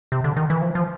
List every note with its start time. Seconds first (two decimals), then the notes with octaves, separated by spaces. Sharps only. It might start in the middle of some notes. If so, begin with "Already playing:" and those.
0.12 C3
0.24 D3
0.36 D#3
0.50 E3
0.62 F3
0.75 F3